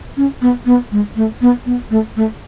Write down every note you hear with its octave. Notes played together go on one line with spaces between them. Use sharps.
C#4
B3
B3
G#3
A3
B3
B3
A3
A3